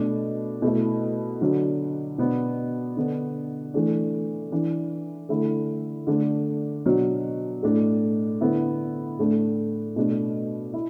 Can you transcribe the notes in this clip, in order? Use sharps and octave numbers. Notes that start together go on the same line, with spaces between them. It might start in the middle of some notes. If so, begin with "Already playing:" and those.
Already playing: B2 A3 D4
B2 A3 E4
D3 F#3 D4
B2 B3 D4
D3 B3 D4
E3 A3 D4
E3 D4
D3 A3 E4
D3 A3 D4
B2 F#3 D4
A2 A3 D4
D3 B3 E4
A2 A3 D4
B2 A3 D4
E4